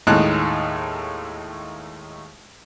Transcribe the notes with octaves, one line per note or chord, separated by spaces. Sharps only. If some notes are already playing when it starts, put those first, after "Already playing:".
D#2 A2 G#3 D#4 A5 F#6